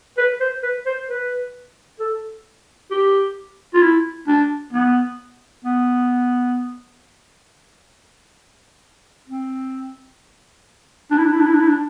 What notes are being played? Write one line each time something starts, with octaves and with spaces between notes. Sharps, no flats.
B4
C5
B4
C5
B4
A4
G4
F4
E4
D4
B3
B3
C4
D4
E4
D4
E4
D4
E4
D4
E4
D4